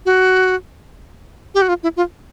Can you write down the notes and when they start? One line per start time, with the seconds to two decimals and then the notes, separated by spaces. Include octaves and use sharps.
0.06 F#4
1.55 G4
1.62 F#4
1.69 F4
1.83 E4
1.97 F4